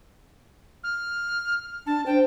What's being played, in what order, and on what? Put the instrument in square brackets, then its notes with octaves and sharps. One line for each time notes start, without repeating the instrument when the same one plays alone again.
[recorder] F6
[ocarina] D4 [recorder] A5
[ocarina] C5 [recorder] G5